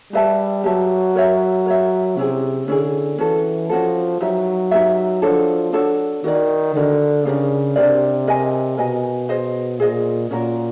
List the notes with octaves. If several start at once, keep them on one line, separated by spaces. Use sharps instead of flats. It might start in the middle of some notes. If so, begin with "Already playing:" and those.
G3 G4 B4 E5 A5
F#3 G4 B4 E5 A5
A#4 C#5 E5
A#4 C#5 E5
C3 C#4 E4 G#4
D3 C#4 E4 G#4
E3 C#4 F#4 A4
F3 C#4 F#4 A4
F#3 D#4 G4 B4 E5
D#4 G4 B4 E5
F3 D4 F#4 A4 C#5
D4 F#4 A4 C#5
D#3 F#4 A#4 D5
D3 F#4 A#4 D5
C#3 D4 G4 A#4 D5
C3 D4 G4 A#4 D5
A#4 D#5 G#5
B2 A#4 D#5 G#5
G#4 C5 D#5
A#2 G#4 C5 D#5
A#2 C#4 F#4 A#4